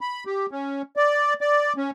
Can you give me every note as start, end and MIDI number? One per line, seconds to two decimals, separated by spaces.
0.01 0.24 83
0.27 0.46 67
0.51 0.82 61
0.96 1.34 74
1.41 1.73 74
1.77 1.90 61